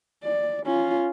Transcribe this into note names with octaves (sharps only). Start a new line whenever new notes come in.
D5
C#4 F4